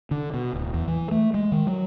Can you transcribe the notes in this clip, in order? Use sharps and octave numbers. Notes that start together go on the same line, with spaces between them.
D3
B2
D1
E2
E3
A3
G#3
D#3
F#3